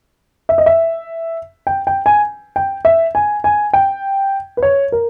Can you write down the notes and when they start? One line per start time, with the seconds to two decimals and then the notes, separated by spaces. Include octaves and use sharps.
0.49 E5
0.58 D#5
0.66 E5
1.67 G5
1.87 G5
2.06 G#5
2.56 G5
2.85 E5
3.15 G#5
3.44 G#5
3.73 G5
4.57 B4
4.63 C#5
4.92 A#4